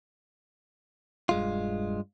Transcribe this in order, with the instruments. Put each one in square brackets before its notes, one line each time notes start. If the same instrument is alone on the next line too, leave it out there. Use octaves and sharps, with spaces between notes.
[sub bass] E1 [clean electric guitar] G2 G#3 F4